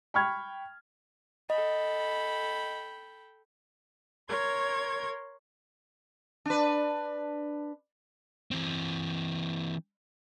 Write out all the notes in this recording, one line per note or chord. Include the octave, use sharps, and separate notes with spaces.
G5 B5 C#6 F6 G#6
A4 D#5 G5 B5
A#4 C#5 C6 G#6
D4 B4
E3 C4